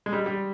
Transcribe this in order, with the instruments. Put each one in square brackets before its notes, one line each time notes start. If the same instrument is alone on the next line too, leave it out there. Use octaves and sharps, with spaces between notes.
[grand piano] G#3
G3
G3